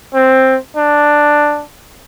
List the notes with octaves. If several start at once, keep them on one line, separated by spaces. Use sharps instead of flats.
C4
D4